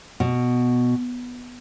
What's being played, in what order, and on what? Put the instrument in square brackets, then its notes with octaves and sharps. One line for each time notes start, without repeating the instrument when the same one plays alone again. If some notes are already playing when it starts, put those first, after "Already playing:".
[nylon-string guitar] B2